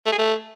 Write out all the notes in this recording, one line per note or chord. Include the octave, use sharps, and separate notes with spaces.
A3
G#4
A3